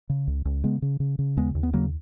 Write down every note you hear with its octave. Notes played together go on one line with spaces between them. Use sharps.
C#3
C#2
C#2
C#3 G#3 B3
C#3
C#3
C#3
D#2 G#3 B3
D#2
B3
C#3 F#3 A#3